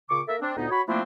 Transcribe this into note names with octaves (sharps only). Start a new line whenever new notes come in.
A#2 C#3 C#6 D6
A#3 A4 A#4 E5
C4 D4
D2 A#2 B3 D#4
F#4 C#5 B5
F3 A3 A#3 C4 D4 E4